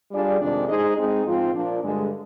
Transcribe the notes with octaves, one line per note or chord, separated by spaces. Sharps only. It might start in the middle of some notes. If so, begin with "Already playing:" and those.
G3 D4 F4 G#4 D5
F2 C3 D#3 G#3 D4
G#3 D#4 G#4 C5 D#5
G#3 C4 D#4 G#4
G#2 F3 C4 F4
A#2 F3 A#3 D4
G2 D3 G#3